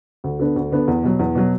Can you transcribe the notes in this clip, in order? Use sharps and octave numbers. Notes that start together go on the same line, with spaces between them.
D2
D3 B3 D4
D2
D3 B3 D4
E2
B2 F#3
E2
B2 F#3